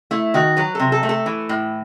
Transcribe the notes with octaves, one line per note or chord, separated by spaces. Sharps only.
A3 E4
D#3 F#4
F#3 B4
C3 A4
A4
A3
A4
E3
A2